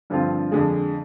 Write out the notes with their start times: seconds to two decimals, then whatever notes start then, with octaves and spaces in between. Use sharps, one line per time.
0.10 G2 D3 F3 C4 F4
0.52 F2 D3 G#3